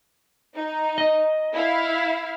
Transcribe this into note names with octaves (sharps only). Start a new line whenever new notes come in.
D#4
D#5
E4 F5